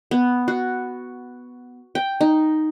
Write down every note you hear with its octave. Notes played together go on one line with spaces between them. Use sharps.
B3
F#4
G5
D#4